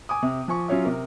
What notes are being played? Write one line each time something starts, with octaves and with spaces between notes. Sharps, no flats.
G#5 D6 D#6
C3
F3 G#5 C#6
F#3 C#4 F4 C#5 E5
C3 A#4